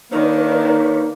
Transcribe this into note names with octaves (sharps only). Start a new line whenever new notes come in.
D#3 A#3 D4 D#4 B4 C#5